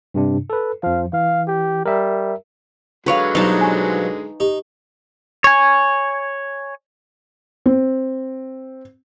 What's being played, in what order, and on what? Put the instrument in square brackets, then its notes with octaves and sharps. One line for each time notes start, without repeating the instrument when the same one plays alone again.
[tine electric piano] G2 C3 D4
A4 B4
[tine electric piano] F2 F3 [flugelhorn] F5
[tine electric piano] E3 [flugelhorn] F5
[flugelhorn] G4
[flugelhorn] G3 [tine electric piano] A#4 E5
[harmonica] D3 F#3 G#3 [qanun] B4 C#5 F5
[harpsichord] B1 F3 G3 [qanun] D#4 A5
[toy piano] G#5 C#6
[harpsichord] D#4 [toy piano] G4
[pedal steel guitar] C#5 G#5
[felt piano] C4